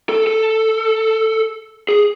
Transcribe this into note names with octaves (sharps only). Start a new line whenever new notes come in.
A4
A4
G#4